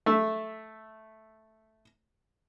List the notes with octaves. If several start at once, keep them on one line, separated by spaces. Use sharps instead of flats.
A3 E5